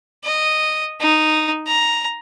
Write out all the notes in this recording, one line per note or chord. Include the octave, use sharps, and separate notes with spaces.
D#5
D#4
A#5